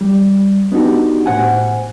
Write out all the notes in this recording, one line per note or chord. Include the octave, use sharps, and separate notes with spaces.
G3
B3 D4 D#4 F#4 G4
A2 C5 F#5 G#5